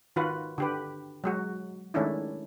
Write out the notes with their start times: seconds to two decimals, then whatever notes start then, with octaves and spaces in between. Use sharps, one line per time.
0.16 D#3 F4 F#4 B4
0.58 D3 G4 B4
1.24 F#3 G#3 F#4
1.94 D#3 G#3 A3 C#4 D4 E4